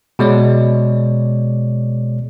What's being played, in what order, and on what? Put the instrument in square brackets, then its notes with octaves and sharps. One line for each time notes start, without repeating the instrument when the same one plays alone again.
[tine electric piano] B2 G#3 C#5 D5